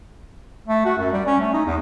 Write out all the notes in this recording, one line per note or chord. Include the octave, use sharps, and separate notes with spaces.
A3
F#4
F#2
G3
C#4
A3
D#4
E2